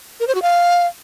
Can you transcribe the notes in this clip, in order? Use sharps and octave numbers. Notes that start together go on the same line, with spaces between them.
A#4
C5
F#4
F5